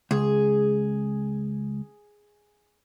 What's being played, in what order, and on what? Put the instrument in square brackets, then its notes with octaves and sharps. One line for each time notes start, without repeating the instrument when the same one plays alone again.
[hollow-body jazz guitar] C#2 [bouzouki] G#4